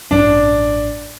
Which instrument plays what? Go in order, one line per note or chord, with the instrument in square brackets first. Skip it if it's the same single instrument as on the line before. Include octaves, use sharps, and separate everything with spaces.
[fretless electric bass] A1 G2 F#3 C#4 [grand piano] D4